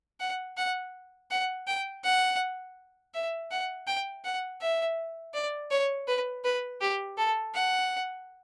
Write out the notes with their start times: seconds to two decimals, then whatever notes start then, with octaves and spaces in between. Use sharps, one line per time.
0.20 F#5
0.57 F#5
1.31 F#5
1.67 G5
2.04 F#5
3.14 E5
3.51 F#5
3.87 G5
4.25 F#5
4.61 E5
5.34 D5
5.71 C#5
6.08 B4
6.45 B4
6.81 G4
7.18 A4
7.55 F#5